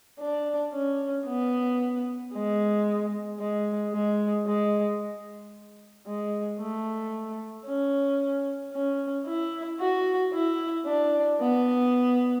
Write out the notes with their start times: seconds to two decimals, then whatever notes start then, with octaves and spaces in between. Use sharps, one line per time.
0.20 D4
0.73 C#4
1.26 B3
2.33 G#3
3.40 G#3
3.93 G#3
4.46 G#3
6.06 G#3
6.60 A3
7.66 C#4
8.73 C#4
9.26 E4
9.80 F#4
10.33 E4
10.86 D4
11.40 B3